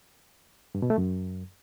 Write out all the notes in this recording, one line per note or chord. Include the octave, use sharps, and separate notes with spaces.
G2
B2
A3
F#2